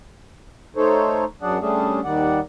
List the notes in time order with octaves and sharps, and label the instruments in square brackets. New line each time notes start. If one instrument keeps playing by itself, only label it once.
[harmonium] A3 D#4 A4 C5 C#5
F#2 F#3 D4 G#4 D5 F#5
G3 A3 C#4 D4 G#4
D#2 D#3 G3 D5 F#5